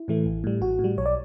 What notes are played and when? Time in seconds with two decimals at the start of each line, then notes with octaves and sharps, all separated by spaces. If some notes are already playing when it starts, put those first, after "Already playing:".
Already playing: E4
0.08 A2 E3 A3
0.26 A1
0.44 A2 G3
0.61 A1 F#4
0.79 A2
0.84 G3
0.98 B1 C#5
1.06 D5